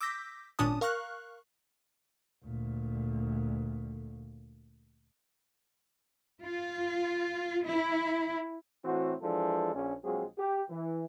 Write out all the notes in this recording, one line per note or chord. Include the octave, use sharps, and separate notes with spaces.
D6 E6 G6 A#6 B6
G#1 A#2 C#4 D4 A5 D#6
A#4 F5 C#6 F6 F#6
D2 A#2
F4
E4
A2 E3 C4 F#4
E3 F3 G#3 D4 A4
A#1 C#4
A#1 F#3 G#3 C4 F4 G#4
G4
E3